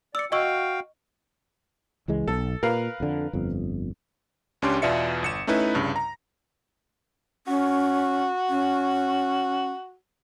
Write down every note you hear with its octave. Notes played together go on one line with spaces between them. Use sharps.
D5 E6 C#7
F#4 D#5 F5 G5 C#6 E6
C#2 E3 G#3
B1 A4
A#2 A#4 B4 F5
F2 D3
G1 F2
C#2 C#4 D4 G4 C6
E2 B2 F4 D5 E5 C#7
G1 C#7 E7
A3 C#4 D#4 E4 B4
C2 G2 C#3
A#5
C#4 F#4
C#4